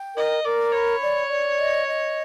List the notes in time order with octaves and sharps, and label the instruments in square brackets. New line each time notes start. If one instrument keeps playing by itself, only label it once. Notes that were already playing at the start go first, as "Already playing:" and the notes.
Already playing: [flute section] G5
[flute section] A#4 [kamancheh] D#5
[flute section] A#4 [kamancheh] D5
[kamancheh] C#5 [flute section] B5
[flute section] D5
D5
D#5
D#5